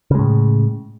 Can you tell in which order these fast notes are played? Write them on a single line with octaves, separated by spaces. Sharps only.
C#3 G#3 A2